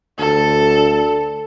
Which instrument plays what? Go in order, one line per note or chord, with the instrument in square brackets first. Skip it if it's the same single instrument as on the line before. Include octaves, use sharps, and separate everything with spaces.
[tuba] D2 [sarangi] A4